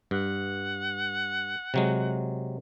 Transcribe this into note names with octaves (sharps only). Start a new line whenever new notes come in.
G2 F#5
C3 F#3 G#3